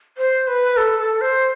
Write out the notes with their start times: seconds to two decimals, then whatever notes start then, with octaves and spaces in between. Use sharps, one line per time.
0.18 C5
0.47 B4
0.77 A4
0.99 A4
1.21 C5